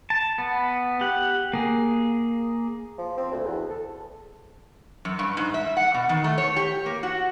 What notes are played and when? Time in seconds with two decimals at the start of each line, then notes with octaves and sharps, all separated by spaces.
0.10 A5
0.38 B3
1.01 G4 F#5
1.53 A#3 G#4
2.98 F3
3.17 C4
3.31 D2
3.43 E2
3.69 A4
5.05 F#2
5.19 G2
5.37 G#2
5.54 E5
5.77 F#5
5.94 B2
6.09 D#3
6.24 A3
6.38 C#5
6.56 G4
6.86 A#3
7.03 F#4